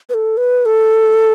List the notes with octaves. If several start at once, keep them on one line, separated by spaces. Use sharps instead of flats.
B4
A4
B4
A4